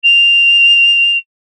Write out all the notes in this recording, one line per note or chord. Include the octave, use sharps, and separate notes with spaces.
F7